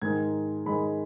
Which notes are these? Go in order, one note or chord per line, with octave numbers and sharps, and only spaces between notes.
G#2 D#3 G#3 G#6
G#2 D#3 G#3 B5